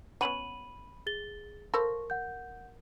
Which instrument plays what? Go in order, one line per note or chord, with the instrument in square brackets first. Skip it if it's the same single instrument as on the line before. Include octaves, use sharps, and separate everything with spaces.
[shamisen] B3 C#4 F#4 [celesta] B5 D#7 F#7
[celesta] G#4 A6 G7
[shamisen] F3 A4 B5 [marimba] A#4 [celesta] C#6
[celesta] F#5 G6